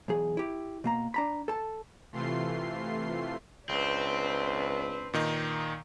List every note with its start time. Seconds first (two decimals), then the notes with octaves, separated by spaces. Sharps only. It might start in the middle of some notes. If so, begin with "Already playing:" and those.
0.08 B1 E2 G#4
0.37 E4 G4
0.84 B2 A#3 A#5
1.14 D4 A#5 B5
1.48 A4 A5
2.12 C3 E3 A3 F4 C6 C7
3.69 C#2 C4 D4 B4
5.14 A#2 D#3 D#4